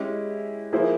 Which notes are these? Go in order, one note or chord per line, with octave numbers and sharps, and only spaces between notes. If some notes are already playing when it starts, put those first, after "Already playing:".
Already playing: G#3 C#4 E4 G4
F3 A#3 E4 G#4 C5